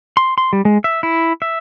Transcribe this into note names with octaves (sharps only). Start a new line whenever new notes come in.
C6
C6
G3
G#3
E5
E4
E5